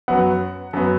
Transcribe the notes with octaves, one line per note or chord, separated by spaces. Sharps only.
F#2 F#3 B3 F#5
F#2 F#3 B3